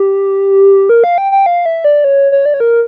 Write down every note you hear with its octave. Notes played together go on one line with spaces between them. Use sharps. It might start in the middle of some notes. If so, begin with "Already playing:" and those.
Already playing: G4
A#4
F5
G5
G5
F5
E5
D5
C#5
C#5
D5
C#5
A#4